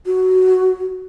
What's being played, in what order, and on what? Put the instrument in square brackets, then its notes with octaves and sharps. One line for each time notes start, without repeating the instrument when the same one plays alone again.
[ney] F#4